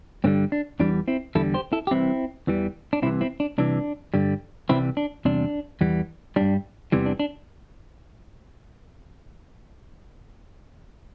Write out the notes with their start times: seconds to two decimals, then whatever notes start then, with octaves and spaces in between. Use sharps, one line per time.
0.24 G2 D3 G3 C4
0.52 D4
0.80 E2 E3 G3 D4
1.08 C4 E4
1.35 E2 D3 G3 E4 A4
1.54 G4 C5
1.73 E4 A4
1.87 G4
1.91 C2 C3 E3 C4 E4
2.47 E2 E3 G3
2.93 D4
3.02 C2 C3 E3 C4 E4
3.21 C4 E4
3.40 D4
3.58 C2 C3 E3 D4
4.14 G2 D3 G3
4.69 C2 C3 E3 G3 C4 E4
4.97 D4
5.25 E2 C3 G3 D4
5.81 E2 E3 G3
6.36 G2 G3 D4
6.92 E2 C3 E3 G3
7.06 D4
7.20 D4